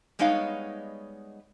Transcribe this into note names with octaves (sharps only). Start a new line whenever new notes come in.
G3 G#3 B3 D#4 C#5 F5